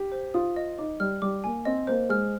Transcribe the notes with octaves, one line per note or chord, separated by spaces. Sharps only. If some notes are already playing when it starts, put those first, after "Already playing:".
Already playing: G4
C5
F4 D#6
D#5
D#4 D6
G3 F6
G3 D6
A#3 G#5
C4 D#5
A#3 C5
G#3 F6